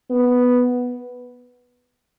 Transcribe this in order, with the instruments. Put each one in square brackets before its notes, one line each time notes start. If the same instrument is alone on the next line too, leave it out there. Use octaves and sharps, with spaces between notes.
[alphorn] B3